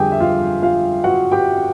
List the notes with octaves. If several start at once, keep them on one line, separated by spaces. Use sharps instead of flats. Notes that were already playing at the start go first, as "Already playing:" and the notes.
Already playing: F2 D3 G3 G4 G#4 G5 G#5
E5
F4 F5
F4 F5
F#4 F#5
G4 G5